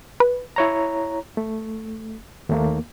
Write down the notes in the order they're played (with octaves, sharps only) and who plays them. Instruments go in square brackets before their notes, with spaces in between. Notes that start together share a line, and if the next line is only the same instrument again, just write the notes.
[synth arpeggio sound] B4
[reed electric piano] E4 C#5 A#5
A3
D#2 A3 A#3